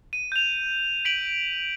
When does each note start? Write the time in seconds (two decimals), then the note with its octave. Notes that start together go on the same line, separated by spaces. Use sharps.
0.13 D#7
0.32 G6 F7
1.05 B6 D7 F#7